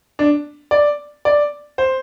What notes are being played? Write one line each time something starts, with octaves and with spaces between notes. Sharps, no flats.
D4
D5
D5
C5